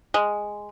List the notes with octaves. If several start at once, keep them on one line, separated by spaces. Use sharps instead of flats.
G#3